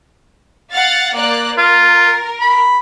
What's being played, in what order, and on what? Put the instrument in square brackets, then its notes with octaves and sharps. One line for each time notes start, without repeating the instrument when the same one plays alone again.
[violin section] F5 F#5 A6
A#3 D5 F#6
[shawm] F4 [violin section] A#4
[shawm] B5